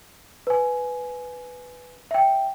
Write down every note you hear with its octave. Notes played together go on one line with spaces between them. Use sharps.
B4 G#5
E5 G5